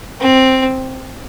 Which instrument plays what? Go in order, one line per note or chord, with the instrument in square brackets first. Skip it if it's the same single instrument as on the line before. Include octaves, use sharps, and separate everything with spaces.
[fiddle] C4